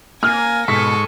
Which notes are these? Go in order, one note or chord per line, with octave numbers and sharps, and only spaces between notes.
A#3 G#5 F6 A#6
G#2 B2 A4 G#5 C#6 B6